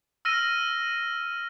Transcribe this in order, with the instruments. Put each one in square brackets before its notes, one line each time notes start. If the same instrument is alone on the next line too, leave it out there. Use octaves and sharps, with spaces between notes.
[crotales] E6 F6 A#6 D#7